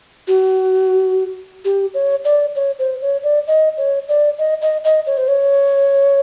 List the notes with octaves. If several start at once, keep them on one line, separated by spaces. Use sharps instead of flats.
F#4
G4
C#5
D5
C#5
C5
C#5
D5
D#5
C#5
D5
D#5
D#5
D#5
C#5
C5
C#5